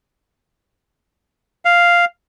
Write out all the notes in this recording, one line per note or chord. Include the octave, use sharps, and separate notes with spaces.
F5